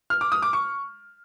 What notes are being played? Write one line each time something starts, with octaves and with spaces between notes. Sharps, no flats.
F6
D6
D#6
D6
C#6